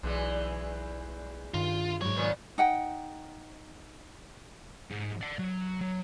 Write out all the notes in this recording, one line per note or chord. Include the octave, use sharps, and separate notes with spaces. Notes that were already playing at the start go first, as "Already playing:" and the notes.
B1 E2 E3 G#3
G2 D#3 F4
B1 G#2 F#3 C#5
A#2 D#3 B3
D#4 F#5 G5
G#2
D5 F#5
F#3
F#3